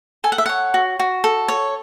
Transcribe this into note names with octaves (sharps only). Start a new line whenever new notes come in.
A4 G#5
F#5
E5
C#5 F#5
F#4
F#4
A4
C#5